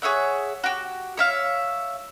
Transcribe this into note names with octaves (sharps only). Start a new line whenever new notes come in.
G#4 C#5 E5 F#5
F#4 G4
C#5 E5 F5